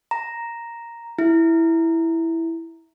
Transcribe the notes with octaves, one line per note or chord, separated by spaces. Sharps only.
A#5
E4